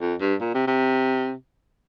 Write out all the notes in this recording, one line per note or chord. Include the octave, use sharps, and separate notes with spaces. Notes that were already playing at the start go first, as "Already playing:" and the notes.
F2
G2
A#2
C3
C3